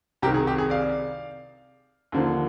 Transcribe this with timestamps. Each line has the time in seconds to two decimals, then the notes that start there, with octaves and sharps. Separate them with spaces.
0.22 C2 C3 D#3 G4 A#4
0.34 G#4
0.47 G4
0.58 G#4
0.70 D5 F5
2.12 D#2 D3 F3 A#3